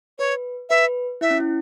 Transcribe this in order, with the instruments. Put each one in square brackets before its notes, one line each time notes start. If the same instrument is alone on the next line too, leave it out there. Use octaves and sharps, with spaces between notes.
[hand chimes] B4 [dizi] C#5
[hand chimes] B4 [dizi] E5
[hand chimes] E4 [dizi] E5
[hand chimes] C#4
E4